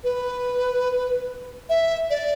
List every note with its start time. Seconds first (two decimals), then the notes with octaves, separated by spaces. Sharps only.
0.04 B4
1.69 E5
2.10 D5